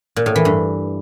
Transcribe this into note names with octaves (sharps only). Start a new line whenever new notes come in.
A#2
A2
E3
G2